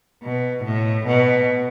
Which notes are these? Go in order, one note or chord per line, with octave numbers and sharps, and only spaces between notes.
B2
A2
B2